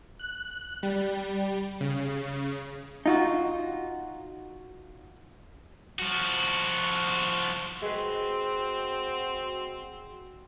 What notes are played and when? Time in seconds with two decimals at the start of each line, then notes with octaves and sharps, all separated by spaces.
0.19 F#6
0.83 G3
1.81 C#3
3.06 D#4 F4 F#4
5.99 F3 F#4
7.82 G#3 C4 F#4 B4